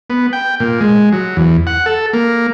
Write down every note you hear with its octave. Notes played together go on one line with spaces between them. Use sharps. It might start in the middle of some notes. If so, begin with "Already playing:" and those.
B3
G5
A#2
G#3
F#3
E2
F#5
A4
A#3